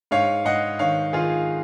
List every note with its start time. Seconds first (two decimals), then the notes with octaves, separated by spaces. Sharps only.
0.11 G#2 C#5 F5
0.45 G#2 D#5 F#5
0.79 D#3 C#5 F5
1.13 D#3 F4 G#4